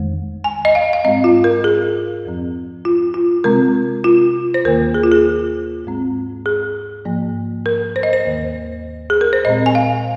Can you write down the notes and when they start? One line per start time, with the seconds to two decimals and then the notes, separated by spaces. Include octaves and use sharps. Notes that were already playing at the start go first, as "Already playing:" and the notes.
Already playing: F2 D#3 G#3
0.44 G#5
0.65 D#5
0.75 F5
0.93 F5
1.04 G#2 G#3 C4 D#5
1.24 F4
1.44 A#4
1.64 G#4
2.25 F2 F3 C4
2.85 F4
3.14 F4
3.44 C3 G#3 C4 A#4
4.04 F4
4.54 C5
4.64 D#2 D#3 A#3 A#4
4.94 G#4
5.03 F4
5.12 G#4
5.85 G#2 G#3 C4
6.46 G#4
7.05 G#2 F3 A#3
7.66 A#4
7.96 C5
8.03 D#5
8.13 C5
8.25 D#2 D#3 A#3
9.10 G#4
9.21 A#4
9.33 C5
9.45 A#2 G#3 C4 D#5
9.66 G#5
9.75 F5